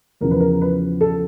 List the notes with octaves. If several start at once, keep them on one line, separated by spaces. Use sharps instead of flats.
E2 C#3 F3 A#4
B4
A#4
B4
A4